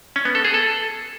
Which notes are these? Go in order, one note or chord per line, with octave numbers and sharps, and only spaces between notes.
C#4
B3
A4
G#4
A4